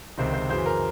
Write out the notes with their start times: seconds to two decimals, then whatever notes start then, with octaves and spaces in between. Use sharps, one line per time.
0.18 C#2 C3 D#3 C5
0.33 C5
0.49 F#2 C#3 E3 C5
0.66 A#4